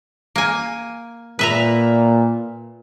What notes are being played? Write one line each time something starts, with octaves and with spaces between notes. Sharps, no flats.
A#3 G#5
A#2 B4 E5 A#5